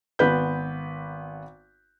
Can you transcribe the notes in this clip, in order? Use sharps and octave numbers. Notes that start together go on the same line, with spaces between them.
G#1 B3 B4 G6